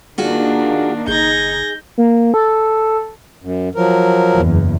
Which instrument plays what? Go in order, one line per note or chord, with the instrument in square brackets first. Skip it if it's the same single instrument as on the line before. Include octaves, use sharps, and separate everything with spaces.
[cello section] D#3 A#3 D4 [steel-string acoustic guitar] F4 F#4 G#4
[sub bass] F#1 [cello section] D#4 [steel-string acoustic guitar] G#4 [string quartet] G6 G#6 A#6
[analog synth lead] A#3
A4
[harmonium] F#2
F3 F#3 A#4
[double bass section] F#1 E2